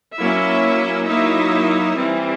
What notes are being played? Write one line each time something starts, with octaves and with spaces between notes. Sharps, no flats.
F#3 A#3 C#4 E4 E5
F#3 A#3 D#4 E4 E5
E3 G3 C4